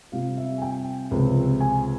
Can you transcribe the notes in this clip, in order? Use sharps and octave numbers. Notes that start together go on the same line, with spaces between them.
C3 G3 C4 F4 F5
E5
G#5
G5
C#2 C3 F3 C4
G#5